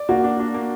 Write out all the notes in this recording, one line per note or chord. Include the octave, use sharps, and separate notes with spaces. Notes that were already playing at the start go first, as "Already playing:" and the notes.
Already playing: D5
A#3 F#4
D4
D4
A#3